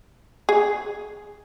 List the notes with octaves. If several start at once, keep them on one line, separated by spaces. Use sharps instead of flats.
G#4